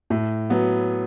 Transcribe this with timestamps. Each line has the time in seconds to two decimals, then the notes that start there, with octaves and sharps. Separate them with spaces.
0.10 A2
0.50 F#3 B3